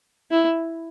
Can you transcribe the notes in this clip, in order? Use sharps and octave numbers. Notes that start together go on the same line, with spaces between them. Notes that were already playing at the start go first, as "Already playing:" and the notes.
E4